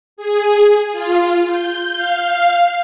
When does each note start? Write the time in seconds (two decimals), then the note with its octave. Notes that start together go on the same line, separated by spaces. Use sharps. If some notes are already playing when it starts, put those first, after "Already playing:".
0.17 G#4
0.92 F4
1.47 G6
1.96 F5